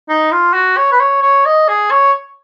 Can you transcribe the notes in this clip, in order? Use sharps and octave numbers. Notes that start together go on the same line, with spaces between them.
D#4
F4
F#4
C#5
B4
C#5
C#5
D#5
G#4
C#5